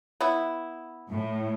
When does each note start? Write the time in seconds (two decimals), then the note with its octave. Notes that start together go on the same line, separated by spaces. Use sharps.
0.21 B3 E4
1.10 A2